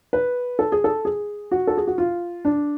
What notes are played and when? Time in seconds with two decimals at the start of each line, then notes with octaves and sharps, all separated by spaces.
0.13 B4
0.59 A4
0.72 G#4
0.84 A4
1.05 G#4
1.51 F#4
1.67 A4
1.77 G#4
1.87 F#4
1.98 F4
2.45 D4